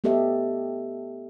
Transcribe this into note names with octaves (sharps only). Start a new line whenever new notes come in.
A3 B3 G4 A4 D#5 E5